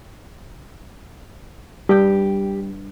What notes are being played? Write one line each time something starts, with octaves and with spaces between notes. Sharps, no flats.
G2 G3 G4 G5